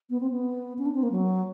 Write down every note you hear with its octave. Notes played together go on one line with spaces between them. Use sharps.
B3
C4
B3
C#4
D4
C4
A#3
F#3